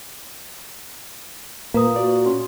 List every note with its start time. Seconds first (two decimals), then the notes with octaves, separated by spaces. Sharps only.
1.74 A#2 A#3 B4 F5 A#5 D#6
1.96 F#4 D5
2.26 C#4 C6